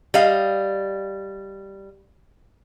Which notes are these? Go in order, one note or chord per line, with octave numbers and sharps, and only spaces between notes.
G3 D#5 F5